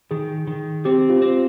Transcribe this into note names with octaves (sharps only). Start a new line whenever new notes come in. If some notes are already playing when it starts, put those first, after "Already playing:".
D#3 G#4
D#3
C4 G4
F4
C4